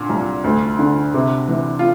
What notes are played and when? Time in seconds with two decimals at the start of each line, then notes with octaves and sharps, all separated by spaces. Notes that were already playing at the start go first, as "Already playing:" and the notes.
Already playing: A#2 D3
0.10 C2
0.44 D2
0.79 D3
1.14 C3
1.48 E3
1.79 F4